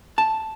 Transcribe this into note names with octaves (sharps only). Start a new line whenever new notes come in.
A5